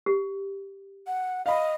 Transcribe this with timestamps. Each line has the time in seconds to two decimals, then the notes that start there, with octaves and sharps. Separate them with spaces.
0.06 G4
1.07 F#5
1.46 D#5 F5 B5